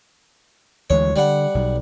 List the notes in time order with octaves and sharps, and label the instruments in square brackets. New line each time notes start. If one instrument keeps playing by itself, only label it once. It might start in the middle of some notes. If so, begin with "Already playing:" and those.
[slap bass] D2 E3 G#3 [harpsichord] C#5
[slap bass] D3 [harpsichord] G3 F#5
[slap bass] B1